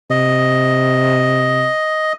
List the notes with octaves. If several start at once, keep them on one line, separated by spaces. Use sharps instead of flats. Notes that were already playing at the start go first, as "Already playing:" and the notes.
C3 D#5